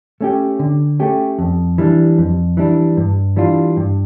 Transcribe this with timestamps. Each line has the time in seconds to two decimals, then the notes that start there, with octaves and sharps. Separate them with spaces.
0.21 A3 C#4 G4
0.59 D3
1.00 A3 C#4 G4
1.39 F2
1.78 E3 G3 D4
2.18 F2
2.57 E3 G3 D4
2.97 G2
3.36 E3 G3 D4 F4
3.77 G2